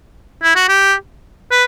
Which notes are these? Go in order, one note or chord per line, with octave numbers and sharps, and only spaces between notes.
E4
F#4
G4
B4